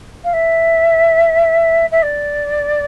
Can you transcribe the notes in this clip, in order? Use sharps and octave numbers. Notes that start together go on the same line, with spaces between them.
F5
E5
E5
D5